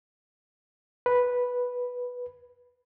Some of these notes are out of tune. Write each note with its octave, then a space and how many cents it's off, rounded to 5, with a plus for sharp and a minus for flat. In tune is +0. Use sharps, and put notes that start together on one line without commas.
B4 -5